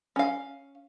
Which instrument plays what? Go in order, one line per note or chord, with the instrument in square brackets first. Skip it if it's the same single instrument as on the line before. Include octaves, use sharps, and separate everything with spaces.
[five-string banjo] C#4 F5